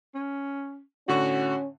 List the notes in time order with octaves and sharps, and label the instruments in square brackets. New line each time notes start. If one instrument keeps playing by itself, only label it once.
[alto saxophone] C#4
[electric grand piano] A2 D3 C#6 [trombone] C#4 [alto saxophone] F#4